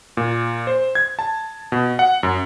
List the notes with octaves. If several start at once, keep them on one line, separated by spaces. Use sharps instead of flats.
A#2
C5
G#6
A5
B2
F#5
F#2